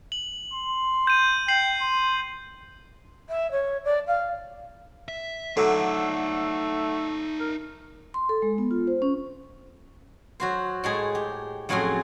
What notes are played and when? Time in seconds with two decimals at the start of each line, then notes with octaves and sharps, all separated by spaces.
0.12 F#7
0.54 C6
1.07 G6 D#7
1.48 G5 G6 C7 F#7
1.81 C6
3.28 E5
3.51 C#5
3.84 D5
4.07 F5
5.08 E5
5.57 D3 F#3 A3 D#4 A4 D5
7.40 A#4
8.14 C6
8.29 A4
8.42 G#3
8.58 B3
8.71 F4
8.87 C5
9.02 C#4
10.40 F#3 F#4 C5
10.84 A2 G#3 G#4
11.15 G4
11.69 F2 A2 F#3 C#4 G#4 C6